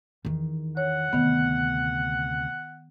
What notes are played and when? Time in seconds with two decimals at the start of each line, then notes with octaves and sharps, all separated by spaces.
0.25 E2 D#3
0.77 C#5 F#5
1.13 D2 C3 D#3 B3